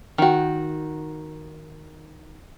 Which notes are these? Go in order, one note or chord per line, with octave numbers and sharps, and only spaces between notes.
D#3 F#4